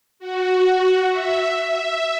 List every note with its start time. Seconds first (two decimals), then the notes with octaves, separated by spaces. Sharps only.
0.19 F#4
1.10 E5
1.62 E5